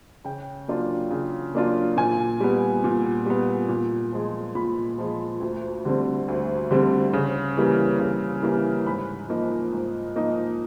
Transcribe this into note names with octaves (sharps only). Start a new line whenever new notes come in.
C#3 G5
F#3 A#3 D4 F4
C#3
F#3 A#3 D4 F4
A#2 G#5
G3 B3
A#2
G3 B3
A#2
F3 G#3
A#2 B5
F3 G#3
D2
D3 G3 C4
D2
D3 G3 C4
C#3
E3 G3 A#3
C#3
E3 G3 A#3
G#2 B5
F3 A#3 D#4
G#2
F3 A#3 D#4